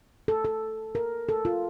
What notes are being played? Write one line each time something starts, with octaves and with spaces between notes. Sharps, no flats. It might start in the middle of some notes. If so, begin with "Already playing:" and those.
A4
A4
A#4
A4
F4